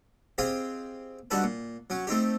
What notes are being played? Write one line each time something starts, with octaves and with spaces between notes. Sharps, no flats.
C4 F4 G4 G#4 D#5 G5
D3 G3 D#4 F#4 A4 B4
A#2
F#3 C#4
A3 C4 D#4 G4